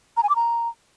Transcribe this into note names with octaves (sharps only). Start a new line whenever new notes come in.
A#5
G#5
D6
A#5